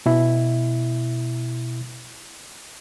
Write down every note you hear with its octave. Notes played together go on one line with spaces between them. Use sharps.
B2 E4